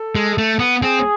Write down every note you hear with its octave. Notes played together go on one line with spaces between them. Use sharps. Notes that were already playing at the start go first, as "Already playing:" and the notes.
Already playing: A4
G#3
A3
B3
C4 G#4